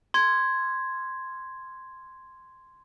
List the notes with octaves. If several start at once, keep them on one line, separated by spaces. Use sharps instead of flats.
C6 G#6